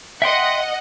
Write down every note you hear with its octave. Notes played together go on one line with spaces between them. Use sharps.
D#5 E5 F#5 G5 C6